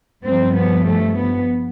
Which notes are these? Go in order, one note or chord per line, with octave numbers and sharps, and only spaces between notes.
G2 F3 C4
B3
A3
B3